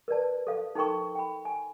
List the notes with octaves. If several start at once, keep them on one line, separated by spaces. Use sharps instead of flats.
A#4 B4 D5 A5
A#4
A4 F5
D#4 A4 A#4 G5 C6 C#6
G5 B5
G#5